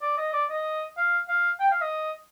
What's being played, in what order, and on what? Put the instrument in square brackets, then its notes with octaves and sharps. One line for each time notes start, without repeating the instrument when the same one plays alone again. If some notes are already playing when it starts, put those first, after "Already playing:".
[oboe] D5
D#5
D5
D#5
F5
F5
G5
F5
D#5